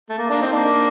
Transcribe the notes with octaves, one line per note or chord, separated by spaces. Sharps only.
A3
A#3
A#3 D4
C4 D#4
A#3 D4